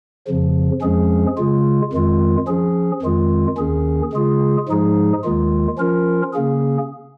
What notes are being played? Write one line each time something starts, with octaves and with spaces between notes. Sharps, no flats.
F2 C#3 F3
F2 F3 G#3 C#4 G#4
C#3 G#3 F4
F2 D#3 G#3 F4
F3 C#4 G#4
F2 D#3 G#3 F4
D#2 D#3 C#4 G#4
C#3 G#3 F4 G#4
G#2 F3 G#3 D#4 G#4
D#2 D#3 G#3 F4
F3 C#4 F4 A#4
C#3 A#3 C#4 G#4